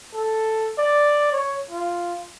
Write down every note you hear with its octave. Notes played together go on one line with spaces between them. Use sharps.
A4
D5
C#5
F4